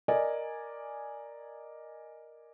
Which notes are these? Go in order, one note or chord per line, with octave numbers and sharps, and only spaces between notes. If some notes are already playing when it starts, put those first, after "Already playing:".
A#4 D5 D#5 G#5